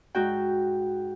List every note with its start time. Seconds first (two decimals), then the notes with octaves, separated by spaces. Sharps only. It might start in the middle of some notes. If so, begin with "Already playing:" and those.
0.15 G#2 F#4 G5